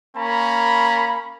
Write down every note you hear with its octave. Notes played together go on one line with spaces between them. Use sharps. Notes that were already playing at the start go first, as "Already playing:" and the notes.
A#3 C#4 A#5 B5